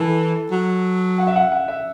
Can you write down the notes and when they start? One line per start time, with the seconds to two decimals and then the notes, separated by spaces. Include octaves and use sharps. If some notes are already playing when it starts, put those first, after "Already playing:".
Already playing: E3 A4
0.51 F#3
1.18 F#5
1.27 E5
1.36 F#5
1.52 F#5
1.68 E5